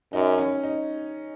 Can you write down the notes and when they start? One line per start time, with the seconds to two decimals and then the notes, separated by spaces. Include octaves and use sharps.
0.13 F#2 D#4
0.38 C#4
0.63 D#4